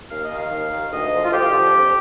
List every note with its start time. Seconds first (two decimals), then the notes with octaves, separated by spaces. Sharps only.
0.10 D#2 F5
0.23 D#5
0.30 D#3
0.37 F5
0.50 D#2
0.70 D#3
0.91 D2 D#5
1.11 D3 F3
1.24 F4
1.31 D2 G4
1.52 D3 F3
1.72 F2